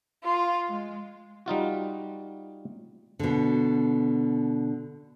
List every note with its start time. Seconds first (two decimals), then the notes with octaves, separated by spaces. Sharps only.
0.22 F4
0.68 G#3
1.46 G3 D#4 F4 F#4
3.19 B2 D3